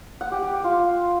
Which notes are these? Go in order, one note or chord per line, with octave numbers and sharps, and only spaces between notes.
F#5
G4
G4
F#5
F4